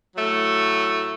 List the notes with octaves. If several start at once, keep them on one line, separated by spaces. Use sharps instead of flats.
A2 F#3 A3